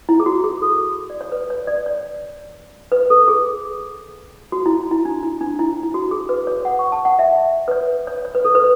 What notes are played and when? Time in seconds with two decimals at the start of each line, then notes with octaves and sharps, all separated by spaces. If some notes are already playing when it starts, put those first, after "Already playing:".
0.09 E4
0.20 G#4
0.26 F#4
0.44 G#4
0.62 A4
1.10 D5
1.21 C#5
1.32 B4
1.50 C#5
1.67 D5
1.86 C#5
2.92 B4
3.10 A4
3.28 G#4
4.52 F#4
4.66 E4
4.91 E4
5.05 D4
5.23 E4
5.41 D4
5.59 E4
5.83 E4
5.94 F#4
6.11 G#4
6.29 B4
6.47 C#5
6.65 F#5
6.79 C#6
6.92 A5
7.05 F#5
7.19 E5
7.68 B4
7.71 C#5
8.07 C#5
8.25 C#5
8.35 B4
8.45 A4
8.55 B4